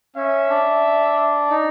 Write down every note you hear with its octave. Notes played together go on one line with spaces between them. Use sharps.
C#4 E5
D4
D#4